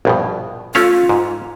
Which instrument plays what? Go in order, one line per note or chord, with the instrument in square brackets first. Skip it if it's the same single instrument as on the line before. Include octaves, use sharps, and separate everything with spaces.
[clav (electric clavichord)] A#1 G2 B2
[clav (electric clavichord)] A3 C#4 F5 [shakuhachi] F4
[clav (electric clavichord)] G#2